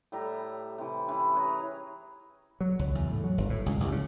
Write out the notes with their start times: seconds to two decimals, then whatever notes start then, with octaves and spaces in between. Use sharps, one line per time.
0.12 A2 G3 E5 A#5
0.78 C3 E3
1.08 E3 C#4 E4
1.34 G#4 B4 C#5 A#5
2.61 F#3
2.79 C#2
2.95 E2
3.12 A2
3.24 F#3
3.38 G1
3.50 A2
3.66 C#2
3.80 C2
3.92 C#3